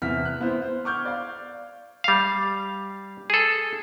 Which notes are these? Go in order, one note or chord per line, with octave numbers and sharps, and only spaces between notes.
E2 C3 E5 F6 B6
F#6
B3 E4 C5
C5
C#6 D6 F6 G6 G#6
D5 F5
G3 F5
G#4 A4